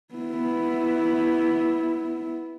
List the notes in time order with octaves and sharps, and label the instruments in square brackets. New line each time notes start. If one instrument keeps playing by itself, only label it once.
[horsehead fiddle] B3 E4